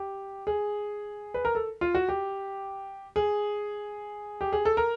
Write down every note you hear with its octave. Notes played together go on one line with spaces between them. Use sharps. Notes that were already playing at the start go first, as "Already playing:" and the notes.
Already playing: G4
G#4
B4
A#4
A4
F4
F#4
G4
G#4
G4
G#4
A4
A#4